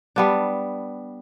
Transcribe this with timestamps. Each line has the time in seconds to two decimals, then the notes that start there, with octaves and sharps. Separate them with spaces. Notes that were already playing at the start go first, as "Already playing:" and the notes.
0.16 G3 B3 D4